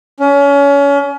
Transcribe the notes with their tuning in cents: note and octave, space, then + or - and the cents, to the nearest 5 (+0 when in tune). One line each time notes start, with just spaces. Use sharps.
C#4 +30